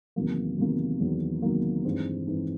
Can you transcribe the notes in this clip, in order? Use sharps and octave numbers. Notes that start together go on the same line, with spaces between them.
E2 C3 D#3 F#3 A#3
E2 C3 D#3 F#3 A#3
E2 C3 D#3 F#3 A#3
E2 C3 D#3 F#3 A#3
G2 E3 G#3 C4 D#4
G2 E3 G#3 C4 D#4